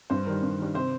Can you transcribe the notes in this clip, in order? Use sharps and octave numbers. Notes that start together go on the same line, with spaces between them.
G2 C5
D#3 G3 A#4
G2
D#3 G3
C3 C5